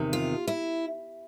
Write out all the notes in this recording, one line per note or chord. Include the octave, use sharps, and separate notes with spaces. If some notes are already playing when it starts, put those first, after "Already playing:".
Already playing: E2 C3 D#3
F4
E4